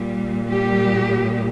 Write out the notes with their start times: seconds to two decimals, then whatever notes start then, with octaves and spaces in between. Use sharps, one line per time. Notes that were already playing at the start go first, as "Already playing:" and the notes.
Already playing: A#2 G3
0.49 G3 G4